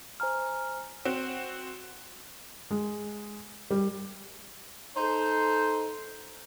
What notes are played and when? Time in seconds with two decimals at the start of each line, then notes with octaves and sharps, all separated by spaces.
0.20 C5 G#5 A#5 F6
1.05 C4 F#4
2.71 G#3
3.71 G3
4.96 D#4 A4 C5